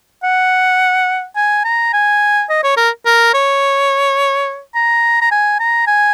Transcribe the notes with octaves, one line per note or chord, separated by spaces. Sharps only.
F#5
G#5
A#5
G#5
D#5
C#5
A#4
A#4
C#5
A#5
A#5
G#5
A#5
G#5